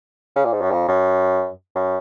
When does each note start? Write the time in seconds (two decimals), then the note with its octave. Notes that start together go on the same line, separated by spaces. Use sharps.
0.36 C#3
0.44 A#2
0.53 G#2
0.61 F#2
0.71 F2
0.88 F#2
1.75 F#2